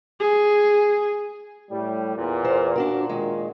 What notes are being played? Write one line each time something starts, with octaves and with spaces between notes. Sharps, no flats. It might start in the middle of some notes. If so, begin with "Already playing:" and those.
G#4
A2 G3
E2 A#2
A#4 C5
A#2 D4 F#4 A#4
D#3 G#3